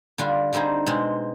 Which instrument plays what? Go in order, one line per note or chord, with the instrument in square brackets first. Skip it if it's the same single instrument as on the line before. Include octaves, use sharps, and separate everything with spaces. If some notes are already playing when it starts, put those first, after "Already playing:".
[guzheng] D3 G3 D4 F4
D3 G3 C4 D#4 G#4
B2 G#3 C4